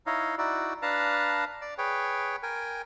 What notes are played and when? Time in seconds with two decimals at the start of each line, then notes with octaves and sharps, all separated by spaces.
0.06 D#4 E4 C#5 D#5 F5
0.38 D#4 E4 F#4 D5
0.82 D4 B4 F5 A5 A#5
1.61 D5
1.78 G#4 B4 C#5 G5
2.43 A#4 G5 G#5